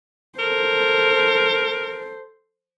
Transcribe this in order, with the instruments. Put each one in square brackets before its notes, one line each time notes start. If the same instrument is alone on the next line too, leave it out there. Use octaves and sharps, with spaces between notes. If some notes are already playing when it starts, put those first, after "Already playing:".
[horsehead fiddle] A4 C5 [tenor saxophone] A#4